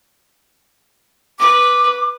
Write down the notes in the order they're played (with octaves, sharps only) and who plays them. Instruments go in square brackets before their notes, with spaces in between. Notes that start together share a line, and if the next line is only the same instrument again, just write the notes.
[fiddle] B4 [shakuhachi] D6